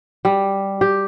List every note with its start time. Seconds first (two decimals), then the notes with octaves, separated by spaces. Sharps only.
0.25 G3
0.81 G4